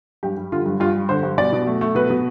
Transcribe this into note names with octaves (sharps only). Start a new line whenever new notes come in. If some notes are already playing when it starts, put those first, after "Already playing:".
G2 G4
G3
D3 F4
G2
G2 F4
G3
D3 C5
G2
B2 D5
B2
A3
A3
B2 B4
B2